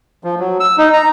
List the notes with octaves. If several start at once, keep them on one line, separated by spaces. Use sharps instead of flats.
F3
F#3
E6
D#4
A#5